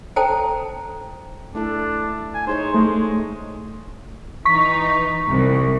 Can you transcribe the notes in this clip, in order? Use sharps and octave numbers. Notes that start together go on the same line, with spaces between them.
A4 C5 G5 A5 A#5
A3 D4 E4 A4
G#5
D#4 G#4 C5 C#5
G#3 A3
E3 D#4 C#6 B6
C2